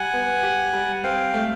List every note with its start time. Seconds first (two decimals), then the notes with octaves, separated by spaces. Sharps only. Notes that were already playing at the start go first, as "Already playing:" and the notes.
Already playing: G3 F#5 G#5
0.13 B3
0.43 G4
0.73 G3
1.04 C4 F5 G5
1.34 A3